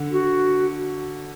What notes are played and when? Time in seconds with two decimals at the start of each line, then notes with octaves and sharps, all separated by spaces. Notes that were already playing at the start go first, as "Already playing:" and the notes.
Already playing: D3
0.11 F#4